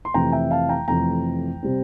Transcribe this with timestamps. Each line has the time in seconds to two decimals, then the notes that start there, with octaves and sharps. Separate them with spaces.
0.05 C6
0.14 F2 C3 E3 A3 G5 A#5
0.32 E5 G5
0.51 F5 A5
0.69 G5 A#5
0.88 F2 C3 E3 A3 G5 A#5
1.63 C3 G3 C4